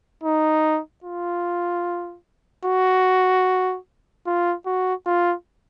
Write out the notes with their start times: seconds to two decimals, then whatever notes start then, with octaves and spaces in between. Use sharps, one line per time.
0.23 D#4
1.04 F4
2.65 F#4
4.27 F4
4.66 F#4
5.06 F4